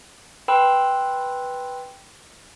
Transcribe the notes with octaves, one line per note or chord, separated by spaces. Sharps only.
B4 G5 B5 C6 E6